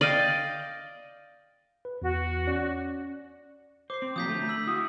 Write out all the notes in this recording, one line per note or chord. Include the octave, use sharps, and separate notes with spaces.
D5 D#5 F5 G5
B4
E2 F#4
C#4 D5
C5 D6 C7
C4
F3 F#3 A#3 D#6 G6 B6
D3 A3
E6 B6 F#7
E4 F#4 D#6